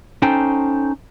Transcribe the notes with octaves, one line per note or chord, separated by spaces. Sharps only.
C#4 D#4 A4 C5 G5